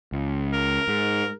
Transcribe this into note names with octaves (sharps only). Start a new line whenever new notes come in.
C#2
A#4
G#2